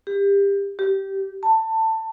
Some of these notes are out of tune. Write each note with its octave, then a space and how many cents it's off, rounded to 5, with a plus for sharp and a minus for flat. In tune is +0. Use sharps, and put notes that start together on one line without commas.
G4 +25
G4 -15
A5 +20